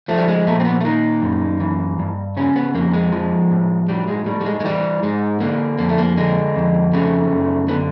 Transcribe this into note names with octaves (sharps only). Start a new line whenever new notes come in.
F3 A3
G3
G#3
A#2 A3
C4
B3
A3
D#3 A#3
F#2
E3
G2
C#3 C#4
B3
F2 A#3
G#3
F3
A2
F#3 G3
G#3
A2 G3
G3
G#3
G#3
E3 G3
G#2 G#3
D3 A#3
F2 A#3
A3
A#3
D3 G#3
F2
C#3 A3
F#2
D3 B3